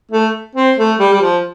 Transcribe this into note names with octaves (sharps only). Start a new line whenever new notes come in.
A3
C4
A3
G3
G3
F3